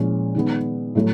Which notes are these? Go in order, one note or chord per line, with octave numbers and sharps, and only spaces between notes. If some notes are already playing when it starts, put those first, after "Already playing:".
Already playing: A#2 F3 G#3 C#4 E4
D#3 G#3 B3
A2 F#3 A3